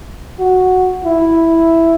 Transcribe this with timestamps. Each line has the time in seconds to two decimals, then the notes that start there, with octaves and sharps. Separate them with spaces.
0.39 F#4
1.05 E4